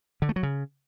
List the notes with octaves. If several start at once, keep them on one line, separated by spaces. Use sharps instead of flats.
D3
A3
F#3
C#3